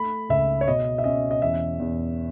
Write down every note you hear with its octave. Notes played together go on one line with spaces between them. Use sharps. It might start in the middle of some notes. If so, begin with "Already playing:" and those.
Already playing: A3 B5
C#2 E5
C#5
B2 D#5
E5
C#4 D#5
D#5
E2 E5
E2